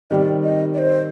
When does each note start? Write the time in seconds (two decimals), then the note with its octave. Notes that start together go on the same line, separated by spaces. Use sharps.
0.11 D#3 G3 C4 G4 D5 D#5
0.43 D#5
0.74 D5
0.78 C5